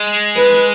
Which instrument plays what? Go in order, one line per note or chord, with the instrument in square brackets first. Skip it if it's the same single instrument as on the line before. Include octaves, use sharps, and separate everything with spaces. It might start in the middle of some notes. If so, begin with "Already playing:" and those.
Already playing: [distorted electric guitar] G#3
[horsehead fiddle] B4